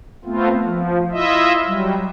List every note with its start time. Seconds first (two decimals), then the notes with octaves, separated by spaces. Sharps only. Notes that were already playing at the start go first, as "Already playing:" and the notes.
0.25 A3 B3 C4 F4
0.63 F3
1.11 E4 F4 D#5 E5
1.65 F#3 G3